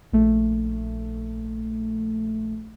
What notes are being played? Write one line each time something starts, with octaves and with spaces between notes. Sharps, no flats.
A#1 A3